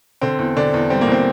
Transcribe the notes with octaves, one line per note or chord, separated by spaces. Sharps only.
D3 C4
E2
D3 D4
E2
G3 C4
A#3
E2 C4